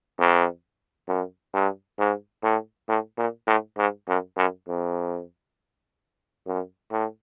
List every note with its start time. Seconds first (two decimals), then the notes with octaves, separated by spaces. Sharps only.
0.19 F2
1.08 F#2
1.54 G2
1.99 G#2
2.43 A2
2.88 A2
3.18 A#2
3.47 A2
3.77 G#2
4.08 F#2
4.37 F#2
4.68 F2
6.46 F#2
6.91 A2